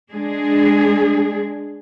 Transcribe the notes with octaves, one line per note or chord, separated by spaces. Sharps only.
G#3 D4 G#4